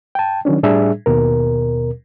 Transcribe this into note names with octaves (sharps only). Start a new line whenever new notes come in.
G5 A5
D#3 F#3 C#4 D4
A2 G3 D4 G#4 E5
D#2 B2 A#4